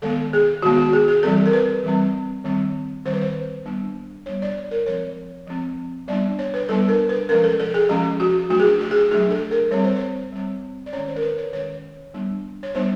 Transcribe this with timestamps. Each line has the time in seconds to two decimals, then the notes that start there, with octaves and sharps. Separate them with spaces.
0.02 D#3 G#3 B3 A4
0.33 G#4
0.62 D#3 G#3 B3 F#4
0.78 F#4
0.93 G#4
1.08 G#4
1.23 E3 G3 C4 A4
1.46 A#4
1.53 B4
1.84 E3 G3 C4
2.44 D#3 G3 C4
3.05 D#3 G3 C4 C5
3.13 B4
3.21 C5
3.65 G3 B3 D4
4.26 G3 B3 D4 C#5
4.42 D5
4.57 C#5
4.71 A#4
4.86 F3 G#3 C4 C#5
5.47 F3 G#3 C4
6.08 G3 B3 D4 D5
6.39 C#5
6.54 B4
6.69 G3 B3 D4 A4
6.89 A#4
7.09 B4
7.29 F3 G#3 C#4 A#4
7.44 A4
7.60 A4
7.74 G#4
7.89 F3 G#3 C#4 G4
8.20 F#4
8.50 F#3 A3 D4 F#4
8.60 G#4
8.65 G4
8.81 G4
8.91 G#4
8.96 G4
9.11 F#3 A3 D4 G#4
9.31 A4
9.51 A#4
9.71 G3 C4 C#5
9.84 C5
9.96 C#5
10.32 G3 C4
10.86 D5
10.93 D#3 G#3 C#4 C#5
11.08 C5
11.16 A#4
11.22 B4
11.38 C#5
11.53 D#3 G#3 C#4 C#5
12.14 G3 B3 D4
12.63 C#5
12.75 G3 B3 D4 C5